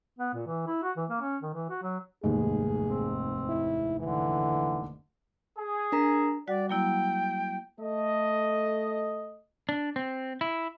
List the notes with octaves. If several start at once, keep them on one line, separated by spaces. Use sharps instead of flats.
B3
A#2
E3
E4
F#4
E3
A#3
C#4
D#3
E3
F#4
F#3
F1 D#2 G#2 G#4
C4
E4
D3 E3
G#4
D4 A#4 A#5
G3 F#4 D5 F#5
F#3 A#3 E4 G5
A3 A4 D#5
D4
C4
E4